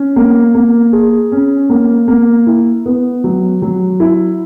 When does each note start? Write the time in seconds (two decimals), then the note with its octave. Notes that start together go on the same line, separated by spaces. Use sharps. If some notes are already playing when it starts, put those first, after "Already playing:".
Already playing: C#4
0.16 A#3
0.55 A#3
0.93 G#4
1.32 C#4
1.69 A#3
2.08 A#3
2.47 E4
2.86 B3
3.24 F#3
3.62 F#3
4.00 E4